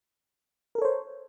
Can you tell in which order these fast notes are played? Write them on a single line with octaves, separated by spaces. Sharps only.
A#4 A4 C#5 C5